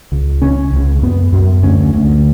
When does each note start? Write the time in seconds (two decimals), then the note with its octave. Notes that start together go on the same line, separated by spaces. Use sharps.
0.12 C#2
0.42 C#3 C#4
0.73 C#2
1.02 F#2 B3
1.33 F#2
1.63 D2 C#4
1.93 D2